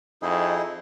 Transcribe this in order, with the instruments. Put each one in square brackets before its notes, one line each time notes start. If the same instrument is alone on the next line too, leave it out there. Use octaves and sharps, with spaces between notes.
[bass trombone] F2 [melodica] D#4 E4 G#4